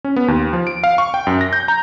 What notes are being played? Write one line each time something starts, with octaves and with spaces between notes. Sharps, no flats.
C#4
B3
D#2
F3
D7
F5
C#6
G5
F#2
A#6
G6
A#5